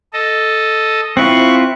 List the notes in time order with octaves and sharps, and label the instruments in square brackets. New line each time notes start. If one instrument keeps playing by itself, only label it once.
[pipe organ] A4 D#5
[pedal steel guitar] C4 E4 F4 [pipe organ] C#6 F#6